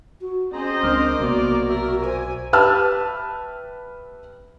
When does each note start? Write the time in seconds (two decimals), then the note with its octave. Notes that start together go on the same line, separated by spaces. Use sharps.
0.21 F#4
0.53 C4 C#4 G#4 C5 D#5 A#5
0.83 C#2 G#3 D4 A#4 D6 F6
1.20 B1 C3 A#3 B3 F#4 D5
1.69 A#4 E5
2.04 C5 G#5
2.53 G4 B4 E5 A5 E6 F6